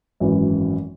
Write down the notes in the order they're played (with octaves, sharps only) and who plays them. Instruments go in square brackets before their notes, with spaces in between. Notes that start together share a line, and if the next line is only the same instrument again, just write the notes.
[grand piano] G#1 F#2 E3